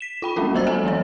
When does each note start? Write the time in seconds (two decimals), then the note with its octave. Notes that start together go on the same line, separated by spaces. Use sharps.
0.01 B6 E7
0.22 F4 G5 B5
0.36 G3 G#3 A#3 C#4 F#4
0.55 F#3 G3 C5 A#5 E6 A6
0.66 A4 F#5 G#5 A#5
0.84 E3 F#3 G3 C#5